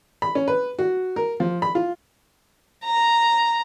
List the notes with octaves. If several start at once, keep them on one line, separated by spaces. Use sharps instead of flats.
B5
C#4
B4
F#4
A#4
F3
B5
F4
A#5